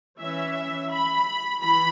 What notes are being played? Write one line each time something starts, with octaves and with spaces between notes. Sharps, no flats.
E3 C#4 E5
B5
E3 B5